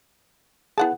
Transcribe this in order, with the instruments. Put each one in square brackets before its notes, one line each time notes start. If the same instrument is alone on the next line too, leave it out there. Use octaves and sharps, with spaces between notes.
[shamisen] B3 F#5 A5 [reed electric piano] E4 G#4